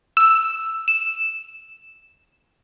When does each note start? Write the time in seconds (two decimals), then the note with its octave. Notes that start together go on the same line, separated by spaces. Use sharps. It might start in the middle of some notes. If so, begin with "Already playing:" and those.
0.17 E6
0.88 E7